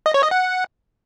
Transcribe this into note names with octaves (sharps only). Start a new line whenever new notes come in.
D#5
C#5
D#5
F#5